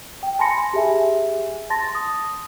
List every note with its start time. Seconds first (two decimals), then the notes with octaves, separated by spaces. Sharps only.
0.23 G5
0.39 G#5 A5 B5 C6 A#6 C#7
0.74 G4 G#4 E5 G#5
1.70 A5 C6 A6 A#6
1.95 D#6